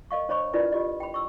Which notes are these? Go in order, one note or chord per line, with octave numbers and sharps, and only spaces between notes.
A#4 D#5 F5 C#6
D4 C5 C#5 D#5 B5 C#6
D4 E4 F4 A#4 B4 D5
F4 G4 D#5
G5 B5
C#6 E6